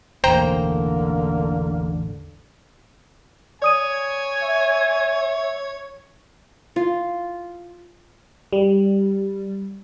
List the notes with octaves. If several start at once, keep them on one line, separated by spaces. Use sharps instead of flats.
E1 A1 D3 A#3 C5 G5 A#5
C#5 D5 G#5 D#6 D#7
E5
F4
G3